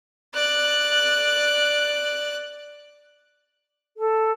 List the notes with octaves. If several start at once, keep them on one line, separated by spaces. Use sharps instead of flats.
D5 F#6
A4